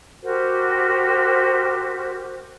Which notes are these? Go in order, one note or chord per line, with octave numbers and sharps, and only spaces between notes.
F#4 G4 A#4 C5